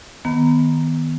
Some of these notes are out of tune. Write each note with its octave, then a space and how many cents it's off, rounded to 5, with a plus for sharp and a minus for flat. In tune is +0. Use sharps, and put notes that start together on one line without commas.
D#3 +10 B3 +0 A#5 +0